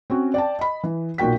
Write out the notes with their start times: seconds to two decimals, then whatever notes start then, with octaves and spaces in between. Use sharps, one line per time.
0.10 C4 C#4 F#4
0.34 D5 G5 A5
0.59 D#5 B5
0.83 E3
1.18 B1 A#2 F#4 G5 B6